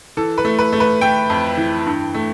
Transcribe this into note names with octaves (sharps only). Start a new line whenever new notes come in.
E3 A4
B4
A3
B4
A3
B4
A3 G5
F2
E3
G2
A3